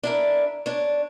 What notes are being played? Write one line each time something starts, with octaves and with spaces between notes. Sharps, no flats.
D4 E4 A#4
D4 C#5